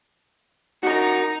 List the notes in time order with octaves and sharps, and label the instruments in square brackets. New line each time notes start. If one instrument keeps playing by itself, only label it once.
[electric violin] D#4 A#5 [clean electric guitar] F#4 A#4